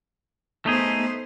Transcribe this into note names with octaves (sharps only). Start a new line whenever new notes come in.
A3 B3 D#4 G#4 C5